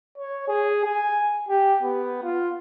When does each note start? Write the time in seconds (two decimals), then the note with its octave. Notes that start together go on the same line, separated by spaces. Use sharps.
0.18 C#5
0.48 G#4
0.85 G#5
1.49 G4
1.83 B3
2.23 F4